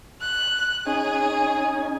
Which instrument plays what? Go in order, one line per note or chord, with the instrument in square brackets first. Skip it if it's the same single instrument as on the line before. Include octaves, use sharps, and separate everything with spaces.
[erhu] F#6
[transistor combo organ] C#4 D#4 G#5 [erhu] G#4